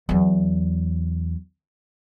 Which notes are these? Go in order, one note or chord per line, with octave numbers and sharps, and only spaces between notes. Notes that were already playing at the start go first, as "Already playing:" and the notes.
E2 F#3